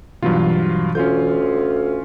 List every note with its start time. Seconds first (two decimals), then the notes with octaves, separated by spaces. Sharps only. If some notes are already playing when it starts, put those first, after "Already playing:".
0.22 G2 B2 E3 F#3 F4
0.95 D2 C#4 F4 G6